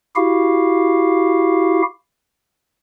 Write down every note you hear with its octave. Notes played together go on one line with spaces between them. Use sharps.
E4 F#4 G4 F5